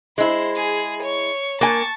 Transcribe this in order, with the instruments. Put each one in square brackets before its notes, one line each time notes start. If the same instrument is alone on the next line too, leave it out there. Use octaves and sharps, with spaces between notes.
[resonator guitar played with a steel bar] G#3 E4 [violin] C5
[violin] G#4
C#5 C#6
[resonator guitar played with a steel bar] A#3 G#5 [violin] A5 C#6